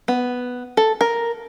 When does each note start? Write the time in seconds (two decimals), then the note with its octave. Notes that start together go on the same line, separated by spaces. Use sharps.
0.08 B3
0.77 A4
1.01 A#4